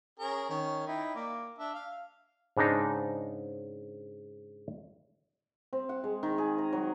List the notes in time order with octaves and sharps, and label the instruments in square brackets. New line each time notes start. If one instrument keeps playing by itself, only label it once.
[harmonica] C#4 G#4 A#4
D#3 C#4
D#4 E4 G5
A#3 D5
D4 E5
F5
[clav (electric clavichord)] G#2 C#3 D4 D#4 A#5
[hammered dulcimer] C4
F#5
G#3
D#3
G#4
A#5
F#3